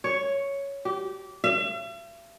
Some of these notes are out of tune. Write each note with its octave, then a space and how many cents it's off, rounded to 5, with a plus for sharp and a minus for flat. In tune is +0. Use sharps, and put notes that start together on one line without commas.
C#5 +5
G4 -20
E5 +45